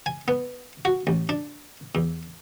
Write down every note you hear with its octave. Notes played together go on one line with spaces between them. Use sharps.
G#5
B3
F#4
A1
D4
E2